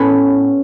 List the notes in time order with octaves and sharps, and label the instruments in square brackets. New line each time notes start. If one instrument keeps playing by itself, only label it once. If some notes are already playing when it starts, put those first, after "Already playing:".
Already playing: [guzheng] A2 B3 C#4